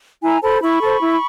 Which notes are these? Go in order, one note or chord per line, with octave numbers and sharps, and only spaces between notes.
E4 G#5 A#5
A4 C5 A5 B5
E4 B5 C#6
A4 C5
E4